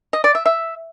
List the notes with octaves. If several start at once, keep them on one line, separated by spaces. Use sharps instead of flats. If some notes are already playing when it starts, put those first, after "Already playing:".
D#5
D5
E5
E5